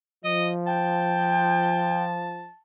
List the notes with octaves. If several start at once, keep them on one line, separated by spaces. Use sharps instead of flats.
F3 D#5
G5 A5